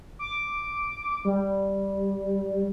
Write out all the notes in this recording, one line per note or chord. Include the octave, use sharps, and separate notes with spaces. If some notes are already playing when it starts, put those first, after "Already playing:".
D6
G3